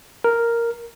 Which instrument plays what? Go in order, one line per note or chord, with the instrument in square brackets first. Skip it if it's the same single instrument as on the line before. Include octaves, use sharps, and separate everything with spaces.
[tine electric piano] A#4